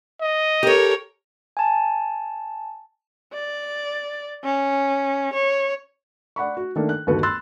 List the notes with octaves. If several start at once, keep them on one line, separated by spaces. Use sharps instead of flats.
D#5
G4 A4 A#4 C#5
G#5 A5
D5
C#4
C#5
D5 F#5 B5 C#6
F#4
D#3 A3 A#3 D4 A4
F#6
G1 D#2 F#4 A4 B4
B5 C6 E6 F#6 A6